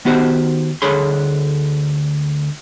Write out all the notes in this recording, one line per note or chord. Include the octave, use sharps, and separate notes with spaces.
D#3 B3 F#4 G4 C5
D2 D3 G#4 C#5 B5 C6